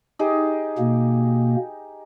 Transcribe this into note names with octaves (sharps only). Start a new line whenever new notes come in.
D#4 G4 G#4
B2 A#3